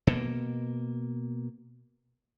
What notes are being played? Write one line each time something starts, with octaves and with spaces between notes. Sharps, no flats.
B2 A#3